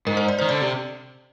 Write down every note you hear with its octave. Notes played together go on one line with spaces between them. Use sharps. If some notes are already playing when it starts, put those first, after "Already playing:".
G#2 A#4
C5
D5
D#3 C5
D3 D5
C3